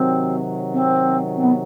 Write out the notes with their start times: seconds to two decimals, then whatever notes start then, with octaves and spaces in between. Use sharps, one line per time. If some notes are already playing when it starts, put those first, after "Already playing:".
Already playing: C3 D#3 F#3 C4
0.73 C4
1.37 C4
1.43 B3